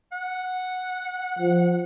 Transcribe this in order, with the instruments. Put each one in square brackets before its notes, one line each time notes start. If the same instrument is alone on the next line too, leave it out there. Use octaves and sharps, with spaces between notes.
[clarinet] F#5
[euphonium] F3